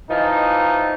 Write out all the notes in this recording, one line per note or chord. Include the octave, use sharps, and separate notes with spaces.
E3 F3 D#4